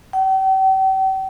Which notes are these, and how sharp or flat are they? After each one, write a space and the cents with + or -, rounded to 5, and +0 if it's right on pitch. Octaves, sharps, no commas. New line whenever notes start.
G5 -40